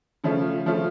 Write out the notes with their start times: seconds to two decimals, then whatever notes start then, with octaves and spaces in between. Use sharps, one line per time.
0.24 C#3 F3 A3 C#4 F4
0.66 C#3 F3 A3 C#4 F4